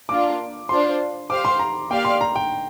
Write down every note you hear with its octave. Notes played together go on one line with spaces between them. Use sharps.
A#3 D4 F4 D6
D4 F4 C5 C6
G4 C5 F5 D6
C6
A#5
A#3 G4 D5 F5 G5
C6
A#5
G5